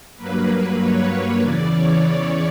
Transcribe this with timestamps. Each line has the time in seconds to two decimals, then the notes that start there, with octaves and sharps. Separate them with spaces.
0.17 G2 F#3 A#3 B4
0.79 C#5
1.39 E2 C#3 E3 D5
1.71 C#5
2.01 D5